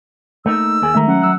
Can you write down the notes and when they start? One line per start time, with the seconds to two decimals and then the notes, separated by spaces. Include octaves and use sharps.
0.46 A3 A#3 D#4 E6
0.82 D#2 A#3 G#4
0.95 D#3 G#3 A3 E5 A#5
1.07 F#3 C#4 F#5
1.21 F#3 E6 F#6